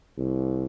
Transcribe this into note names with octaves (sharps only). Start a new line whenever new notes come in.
C2